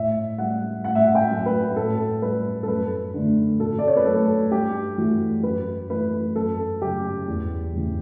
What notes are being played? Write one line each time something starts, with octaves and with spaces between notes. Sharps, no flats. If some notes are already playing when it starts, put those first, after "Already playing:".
Already playing: A2 E5
G3 F#5
A2 F#5
E5
F#5
G5
F#3 A3
B4
A2 A4
G3 B4
A4
F#2 B4
D3 A3
B2 A4
D5
C#5
B4
F#3 A3 A4
G2 G4
E3 A3 F#4
F#2 B4
E3 A3 B4
F#2 A4
C#3 F#3 G4
E2
C#3 E3